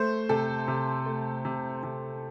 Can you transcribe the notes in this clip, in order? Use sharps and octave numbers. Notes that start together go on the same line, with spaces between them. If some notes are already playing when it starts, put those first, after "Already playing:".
Already playing: A3 C5
C3 A4
C3
A3
C3
C3